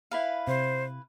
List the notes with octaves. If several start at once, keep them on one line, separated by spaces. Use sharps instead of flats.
E4 B4 F5
C3 C5